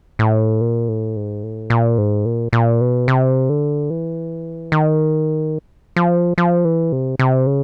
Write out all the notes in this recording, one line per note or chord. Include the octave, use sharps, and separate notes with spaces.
A2
A#2
A2
G#2
A2
A#2
G#2
A#2
A#2
B2
C3
D3
E3
D#3
F3
F3
E3
C3
C3
C#3